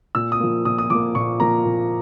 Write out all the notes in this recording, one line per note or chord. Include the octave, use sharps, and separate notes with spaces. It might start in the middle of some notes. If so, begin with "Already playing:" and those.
A#2 E6
D#6
F3 A#3
A#2 D#6
D#6
F3 A#3 D6
A#2 C#6
F3 A#3 A#5
A#2